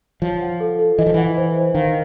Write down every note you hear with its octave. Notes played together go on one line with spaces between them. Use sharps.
F3 C#5
F#5
A4
A4
E3 D#5
F3
E3 F#5
C5
C5
D#3 F5